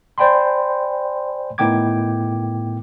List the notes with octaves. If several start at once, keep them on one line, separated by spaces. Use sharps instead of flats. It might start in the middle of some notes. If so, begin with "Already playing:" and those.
C5 D5 G5 G#5 B5 C6
A2 D#3 B3 G5 D6 G#6